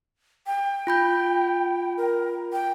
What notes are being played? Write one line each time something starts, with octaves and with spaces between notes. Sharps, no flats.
G5
F4 B5 G6
A#4
G5